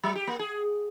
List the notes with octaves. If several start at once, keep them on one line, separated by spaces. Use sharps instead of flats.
F#3
G4
A#3
G#4